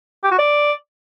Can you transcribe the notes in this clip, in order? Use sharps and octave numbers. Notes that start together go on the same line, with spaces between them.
G4
F#4
D5